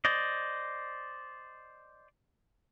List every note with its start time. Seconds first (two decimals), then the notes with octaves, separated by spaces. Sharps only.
0.05 C5 D5 D#5